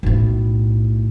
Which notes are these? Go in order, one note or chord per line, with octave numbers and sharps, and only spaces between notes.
B1 A2